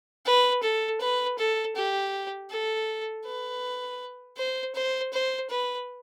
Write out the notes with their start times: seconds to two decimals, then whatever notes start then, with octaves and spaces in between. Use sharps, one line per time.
0.26 B4
0.63 A4
1.01 B4
1.39 A4
1.76 G4
2.50 A4
3.26 B4
4.37 C5
4.75 C5
5.13 C5
5.50 B4